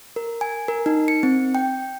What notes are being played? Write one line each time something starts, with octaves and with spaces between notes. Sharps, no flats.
A#4
G#5
A#4
D#4
C#7
C4
G5